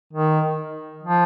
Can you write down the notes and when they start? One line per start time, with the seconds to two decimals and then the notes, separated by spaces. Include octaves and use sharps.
0.13 D#3
1.03 F3